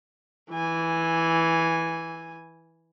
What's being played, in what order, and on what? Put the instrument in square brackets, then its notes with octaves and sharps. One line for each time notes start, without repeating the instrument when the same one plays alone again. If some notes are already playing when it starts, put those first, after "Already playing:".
[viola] E3 G#5